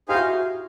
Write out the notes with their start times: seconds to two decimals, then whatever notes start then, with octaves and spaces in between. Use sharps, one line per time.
0.08 D#4 G4 G#4 C5 F5
0.15 E4 F#4